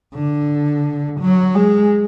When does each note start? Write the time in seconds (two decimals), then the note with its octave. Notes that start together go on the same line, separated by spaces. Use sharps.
0.14 D3
1.20 F#3
1.55 G#3